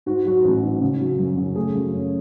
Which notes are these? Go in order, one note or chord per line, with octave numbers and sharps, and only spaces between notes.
G#2 F#4
F#3 F#4
A1
G#2
C#3
F#3
F#2
C#3
A3 G#4
F#2
C#4